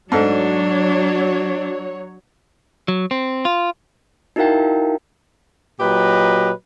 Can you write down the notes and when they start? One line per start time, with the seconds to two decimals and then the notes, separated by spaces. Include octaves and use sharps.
0.12 G#2 F#3 A3 D4 C#5
2.88 F#3
3.11 C4
3.45 F4
4.36 D#4 E4 F#4 A#4 F5 G5
5.80 A#2 F#3 G4 B4 D#5